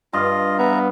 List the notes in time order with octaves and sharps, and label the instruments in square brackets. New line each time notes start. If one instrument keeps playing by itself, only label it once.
[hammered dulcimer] G2 F5 [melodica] F4 D#5
[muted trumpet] B3 [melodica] E5 A#5